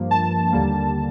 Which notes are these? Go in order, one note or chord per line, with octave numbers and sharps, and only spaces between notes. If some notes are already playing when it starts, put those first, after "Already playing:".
Already playing: G2 F3 A#3
A5
D#2 D3 G3 A#3